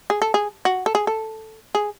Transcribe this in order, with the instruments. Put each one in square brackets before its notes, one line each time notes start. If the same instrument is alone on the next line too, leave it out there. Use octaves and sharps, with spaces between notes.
[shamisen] G#4
A4
G#4
F#4
A4
G#4
A4
G#4